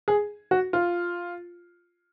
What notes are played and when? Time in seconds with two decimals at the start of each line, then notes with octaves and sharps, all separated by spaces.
0.08 G#4
0.51 F#4
0.73 F4